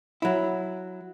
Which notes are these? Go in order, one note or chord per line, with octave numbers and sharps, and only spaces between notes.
F#3 E4